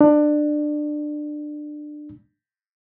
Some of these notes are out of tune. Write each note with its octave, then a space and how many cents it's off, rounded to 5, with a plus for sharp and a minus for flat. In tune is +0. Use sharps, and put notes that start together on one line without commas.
D4 +20